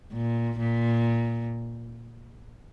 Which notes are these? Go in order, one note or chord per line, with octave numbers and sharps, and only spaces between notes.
A#2
A#2